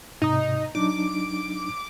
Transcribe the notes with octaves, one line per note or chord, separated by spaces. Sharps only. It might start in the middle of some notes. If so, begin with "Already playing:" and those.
G#2 C3 D#4 D#6
F#3 D4 D#4 D6